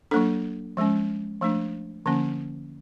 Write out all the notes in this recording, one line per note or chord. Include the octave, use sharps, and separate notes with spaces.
F#3 A#3 D4 A4
F3 G#3 C#4
F3 A3 D4
D3 F3 A#3 C#4